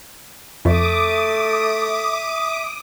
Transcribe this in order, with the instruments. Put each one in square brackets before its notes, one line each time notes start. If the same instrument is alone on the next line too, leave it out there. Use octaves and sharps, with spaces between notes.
[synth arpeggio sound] F2 [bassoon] A3 [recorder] E5 [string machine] D6 D#6